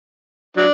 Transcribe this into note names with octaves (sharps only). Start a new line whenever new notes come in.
F#3 D4